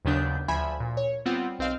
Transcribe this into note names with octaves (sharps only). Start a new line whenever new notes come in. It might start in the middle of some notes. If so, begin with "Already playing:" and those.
D#2 C#3 F#3 B3 D4 G6
D2 F3 E5 G#5 B5 G#6
A#2
C#5
G3 B3 C4 F4 F#5
B1 C4 D#5 F5 F6